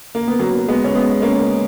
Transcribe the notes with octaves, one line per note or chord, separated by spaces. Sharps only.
A#3
B3
F#3 A#3
G#3 B3
C#4
G#3 B3
A#3 C#4